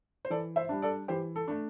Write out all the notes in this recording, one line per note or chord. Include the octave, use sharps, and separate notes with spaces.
C5
E3 A4 D5
C5 E5
G3 D4
A4 D5
E3 G4 C5
A4
A3 D4